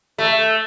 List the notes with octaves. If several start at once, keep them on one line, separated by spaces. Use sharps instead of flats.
A3